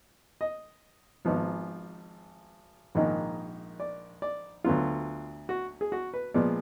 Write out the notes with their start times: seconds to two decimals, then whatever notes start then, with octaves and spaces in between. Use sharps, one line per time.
0.41 D#5
1.25 G#1 G#2 F3 B3
2.95 A#1 G#2 D#3 A#3
3.80 D5
4.22 D5
4.64 D2 D3 F#3 B3 F4
5.49 F#4
5.81 G#4
5.92 F#4
6.14 B4
6.34 A#2 F3 G#3 B3 D5